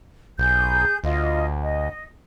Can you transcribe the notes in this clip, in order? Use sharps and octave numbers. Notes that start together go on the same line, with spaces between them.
B1 G#4 G6
D2 F4 D#5
D#5